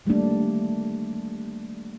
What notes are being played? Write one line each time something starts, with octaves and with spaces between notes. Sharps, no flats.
D#3 G3 A3 A#3 D4